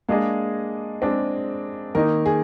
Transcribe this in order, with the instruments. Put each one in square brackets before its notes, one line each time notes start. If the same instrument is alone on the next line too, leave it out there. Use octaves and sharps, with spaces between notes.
[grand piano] G#3 D4 G#4 D#5 [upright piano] A#3
[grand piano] G#3 D4 G#4 D#5 [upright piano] C4
[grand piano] D#3 A#3 D#4 [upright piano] A#4
[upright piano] G#4